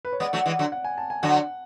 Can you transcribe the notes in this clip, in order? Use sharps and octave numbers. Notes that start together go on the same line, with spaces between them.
B4
C#5
G#3 B3 D5
F#3 A3
E3 G#3
D3 F#3
F#5
G#5
A5
G#5
D3 F#3 F#5